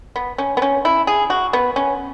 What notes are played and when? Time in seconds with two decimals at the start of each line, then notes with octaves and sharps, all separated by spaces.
0.16 B3
0.38 C#4
0.57 B3
0.62 C#4
0.85 E4
1.07 G#4
1.30 F#4
1.53 B3
1.76 C#4